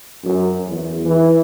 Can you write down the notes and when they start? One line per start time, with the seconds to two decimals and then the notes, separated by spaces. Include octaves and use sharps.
0.24 F#2
0.67 E2
1.05 E3